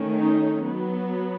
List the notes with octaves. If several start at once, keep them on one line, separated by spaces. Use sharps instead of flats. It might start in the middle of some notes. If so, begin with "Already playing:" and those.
Already playing: D#3 A3 C#4
D#4
F#3 B3